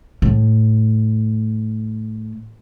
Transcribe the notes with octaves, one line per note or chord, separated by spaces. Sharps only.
A2